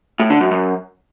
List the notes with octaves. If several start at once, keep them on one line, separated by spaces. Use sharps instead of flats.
A2
D3
F#2
F#2